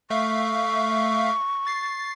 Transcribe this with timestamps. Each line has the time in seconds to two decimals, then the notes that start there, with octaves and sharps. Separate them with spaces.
0.10 A3 E5 F5 C#6
1.67 A6 C7